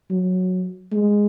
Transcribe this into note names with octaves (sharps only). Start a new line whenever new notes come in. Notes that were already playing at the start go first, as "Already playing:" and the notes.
F#3
G#3